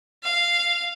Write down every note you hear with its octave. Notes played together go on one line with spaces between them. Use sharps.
F5